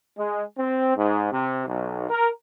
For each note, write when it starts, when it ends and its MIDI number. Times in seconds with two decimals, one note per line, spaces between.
0.18 0.43 56
0.59 0.93 60
0.97 1.30 44
1.32 1.65 48
1.67 2.10 35
2.10 2.29 70